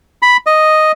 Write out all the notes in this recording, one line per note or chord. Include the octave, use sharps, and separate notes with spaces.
B5
D#5